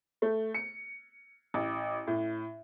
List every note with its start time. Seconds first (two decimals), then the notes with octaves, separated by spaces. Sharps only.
0.22 A3
0.54 C#7
1.54 A1
2.07 A2